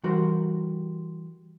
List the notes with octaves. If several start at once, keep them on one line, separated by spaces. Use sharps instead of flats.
E3 G3 F#4 A#4 C5